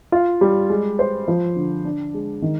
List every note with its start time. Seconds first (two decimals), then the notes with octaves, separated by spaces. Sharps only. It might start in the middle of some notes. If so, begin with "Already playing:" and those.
0.12 F4
0.41 G3
0.70 G#3
0.99 C5
1.28 F3
1.56 D3
1.85 D4
2.14 G#3
2.42 D#3